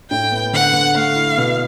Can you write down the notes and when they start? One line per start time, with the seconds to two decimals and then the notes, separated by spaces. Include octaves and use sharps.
0.10 A2 G5
0.32 B3
0.53 D3 F#5
0.74 D3
0.95 A3 F5
1.16 E4
1.38 B2